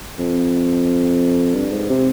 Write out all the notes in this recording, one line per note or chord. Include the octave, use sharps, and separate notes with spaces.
F2
G2
G#2
C3